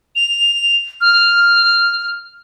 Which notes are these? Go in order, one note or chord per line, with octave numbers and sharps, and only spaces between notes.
F7
F6